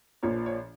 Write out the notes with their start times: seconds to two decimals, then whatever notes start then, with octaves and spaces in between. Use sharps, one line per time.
0.23 A#1 A#2 F3 C#5
0.46 C#5